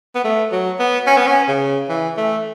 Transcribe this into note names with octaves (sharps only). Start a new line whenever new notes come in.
B3
A3
F#3
B3
C#4
B3
C#4
C#3
E3
A3